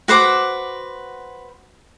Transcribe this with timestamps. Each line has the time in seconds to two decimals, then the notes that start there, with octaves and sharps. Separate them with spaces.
0.08 F#4 B4 C5 D6